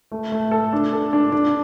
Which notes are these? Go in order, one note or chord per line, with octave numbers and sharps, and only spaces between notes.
A3
A3
A4
D4
A4
D4
D4